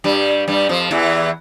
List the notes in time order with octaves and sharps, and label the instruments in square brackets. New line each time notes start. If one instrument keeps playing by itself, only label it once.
[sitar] G2 G3
G2 G3
F2 F3
E2 E3